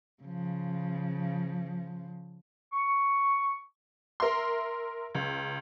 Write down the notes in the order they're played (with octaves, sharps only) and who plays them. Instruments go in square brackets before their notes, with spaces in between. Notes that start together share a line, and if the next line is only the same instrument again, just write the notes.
[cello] C#3 F3
[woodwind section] C#6
[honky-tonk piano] A#4 E5 C6
C#2